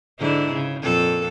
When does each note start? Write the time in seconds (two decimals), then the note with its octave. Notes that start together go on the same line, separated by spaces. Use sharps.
0.19 G#2 D3 E4
0.53 C#3
0.83 F2 A#2 A4